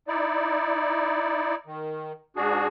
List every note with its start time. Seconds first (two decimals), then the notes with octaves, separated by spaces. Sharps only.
0.08 D#4 E4 D5
1.66 D#3
2.36 G#2 D4 F#4 G#4